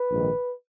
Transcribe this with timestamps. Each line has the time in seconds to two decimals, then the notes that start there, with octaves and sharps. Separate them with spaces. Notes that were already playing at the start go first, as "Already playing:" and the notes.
Already playing: B4
0.10 A#1 G#2 D#3